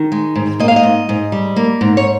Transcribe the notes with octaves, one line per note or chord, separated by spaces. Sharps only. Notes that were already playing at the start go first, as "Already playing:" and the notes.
Already playing: D#3
G#3
G#2
A#3 D#5
F5
D#5
G#2
G#2
G3
A#3
G#2
C#5